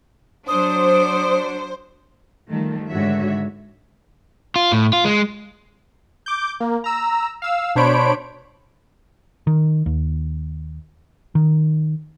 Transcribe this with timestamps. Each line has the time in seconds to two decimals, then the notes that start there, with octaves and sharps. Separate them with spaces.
0.48 F#3 D4 C5 D#6
2.50 D#3 F3 G3 A3
2.90 G#2 D3 D#3 F#4 C#5 E5
4.56 F4
4.72 A2
4.93 F4
5.05 G#3
6.26 D6 G6
6.60 A#3
6.84 A#5 E6
7.42 F5 E6
7.75 B2 D4 C5 C#5 B5 D7
9.47 D#3
9.86 D#2
11.35 D#3